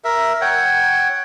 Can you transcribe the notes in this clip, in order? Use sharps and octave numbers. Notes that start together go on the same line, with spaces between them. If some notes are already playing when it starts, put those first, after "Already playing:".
A#4 E5
C#5 F#5 G5